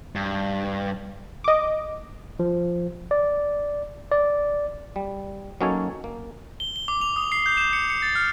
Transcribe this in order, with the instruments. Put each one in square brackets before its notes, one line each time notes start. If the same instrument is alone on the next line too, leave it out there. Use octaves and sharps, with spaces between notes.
[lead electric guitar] G2
[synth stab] D#5 D6
[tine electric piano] F3
D5
D5
[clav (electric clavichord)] G3
F#3 A#3 C#4 D#4 A4 C#5
A#3
[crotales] G7
G7
D6
F7
D#6
C7
G6
E7
C#7
C#7
A6
F6